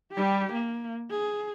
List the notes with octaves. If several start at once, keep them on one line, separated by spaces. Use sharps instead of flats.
G3 G4
A#3
G#4